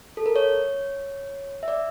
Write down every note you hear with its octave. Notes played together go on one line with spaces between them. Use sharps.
A4
A#4
C#5
E5
D5